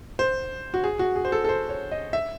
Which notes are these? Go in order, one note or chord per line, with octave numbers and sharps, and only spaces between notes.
C5
F#4
G#4
F#4
G#4
C5
A4
A4
C5
C#5
D#5
E5